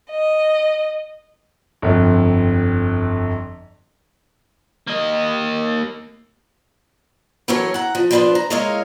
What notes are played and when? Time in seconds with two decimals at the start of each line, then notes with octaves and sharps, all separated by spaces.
0.10 D#5
1.82 G1 F2
4.87 A#3 D#5
7.48 E3 F#3 C#4 A4 A#4 C#5
7.74 F#5 A#5
7.95 F3
8.11 F3 B3 D4 G#4 B4 C5
8.35 A#5
8.50 G#3 E4 A#4 C#5 D#5 F5